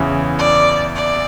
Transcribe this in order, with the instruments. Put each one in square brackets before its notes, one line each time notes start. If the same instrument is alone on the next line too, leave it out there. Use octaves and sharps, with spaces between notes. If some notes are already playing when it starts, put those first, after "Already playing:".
Already playing: [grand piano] E2 C#3 E3
[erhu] D5
D5